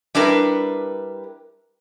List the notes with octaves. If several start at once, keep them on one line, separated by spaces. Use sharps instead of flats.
G3 D4 E4 A#4 B4